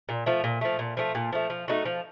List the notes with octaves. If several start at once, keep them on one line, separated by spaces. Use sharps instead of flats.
A#2
F3 A3
A#2
F3 A3
A#2
F3 A3
A#2
F3 A3
F3
A3 D#4 F#4
F3